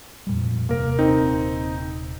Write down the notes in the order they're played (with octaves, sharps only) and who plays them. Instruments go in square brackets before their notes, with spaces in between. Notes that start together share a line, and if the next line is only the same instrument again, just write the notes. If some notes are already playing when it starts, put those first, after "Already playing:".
[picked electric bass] F2 A#2 G3
[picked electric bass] D#1 C3 [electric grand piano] A#3 A#4
[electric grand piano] C4 D#4